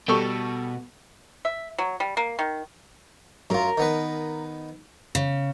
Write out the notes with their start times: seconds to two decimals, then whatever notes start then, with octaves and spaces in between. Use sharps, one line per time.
0.08 B2 G3 A4 C#6
1.45 E5
1.78 F#3
2.00 G3
2.17 A#3
2.39 D#3
3.50 F#2 F4 A#4 A#5
3.77 D#3 B3 B4
5.15 C#3